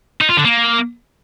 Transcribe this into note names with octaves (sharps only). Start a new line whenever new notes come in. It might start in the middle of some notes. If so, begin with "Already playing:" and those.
D#4
F4
D3
A#3